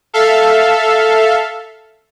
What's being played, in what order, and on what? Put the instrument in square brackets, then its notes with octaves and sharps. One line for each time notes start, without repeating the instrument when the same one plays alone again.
[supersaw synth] A4 E5 F5